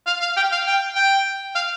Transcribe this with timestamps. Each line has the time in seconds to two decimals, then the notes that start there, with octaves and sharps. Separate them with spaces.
0.07 F5
0.21 F5
0.37 G5
0.52 F5
0.67 G5
0.95 G5
1.55 F5